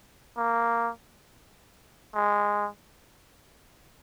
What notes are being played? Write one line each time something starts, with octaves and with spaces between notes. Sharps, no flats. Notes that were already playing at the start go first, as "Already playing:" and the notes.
A#3
G#3